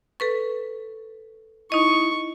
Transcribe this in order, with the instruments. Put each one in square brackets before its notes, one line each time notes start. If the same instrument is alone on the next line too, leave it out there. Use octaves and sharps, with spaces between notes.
[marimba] A4 B4 C#6
[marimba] D#4 D#5 [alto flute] E4 [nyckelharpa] C#6